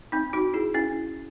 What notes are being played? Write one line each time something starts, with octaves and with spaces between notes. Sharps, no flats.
C4 D#4
D#4 F#4
E4 G#4
C#4 E4